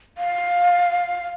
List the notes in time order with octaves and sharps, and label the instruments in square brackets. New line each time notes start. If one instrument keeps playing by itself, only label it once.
[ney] F5